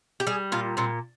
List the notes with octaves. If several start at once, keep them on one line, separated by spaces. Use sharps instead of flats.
G4
G3 G#4
A#2 F4
A#2 C4